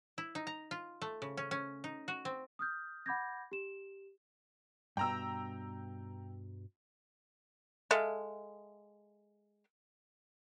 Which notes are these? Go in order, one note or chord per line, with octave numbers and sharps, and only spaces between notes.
E4
D#4
A#5
F4
A3
C#3
C#4
C#4
D#4
F#4
C4
D#6 F6 G6
F#5 B5 D6 G6 G#6 A#6
G4 E7
G2 B2 G5 A#5 E6
G#3 A4 E5 F5